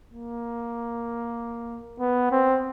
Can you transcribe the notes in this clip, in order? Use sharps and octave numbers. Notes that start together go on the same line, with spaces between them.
A#3
B3
C4